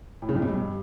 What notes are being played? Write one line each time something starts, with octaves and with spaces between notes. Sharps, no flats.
A2
C#3
F2
B2
G2